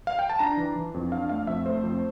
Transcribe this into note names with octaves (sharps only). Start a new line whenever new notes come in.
F5
G5
A5
D4 A#5
E3
E3
F2
D4 F5
A3 F5
F2 E5
A3 C5
F2